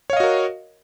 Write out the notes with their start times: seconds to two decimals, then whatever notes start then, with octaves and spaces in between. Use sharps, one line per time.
0.10 C#5
0.13 F5
0.17 D#5
0.20 F#4
0.24 A#4